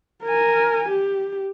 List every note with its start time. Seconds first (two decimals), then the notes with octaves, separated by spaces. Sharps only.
0.24 A#4 G#5
0.89 G4